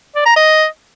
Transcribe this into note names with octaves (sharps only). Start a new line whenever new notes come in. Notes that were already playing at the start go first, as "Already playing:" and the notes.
D5
A#5
D#5